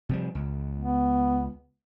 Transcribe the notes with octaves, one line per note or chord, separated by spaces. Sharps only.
C3 F3 G3
C#2
B3